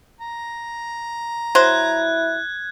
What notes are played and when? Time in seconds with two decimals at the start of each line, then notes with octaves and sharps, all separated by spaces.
0.20 A#5
1.55 F#3 E4 C5 F#6 G#6